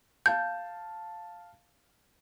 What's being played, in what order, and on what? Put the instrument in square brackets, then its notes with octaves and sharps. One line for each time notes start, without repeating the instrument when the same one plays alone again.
[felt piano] F5 A5 [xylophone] G6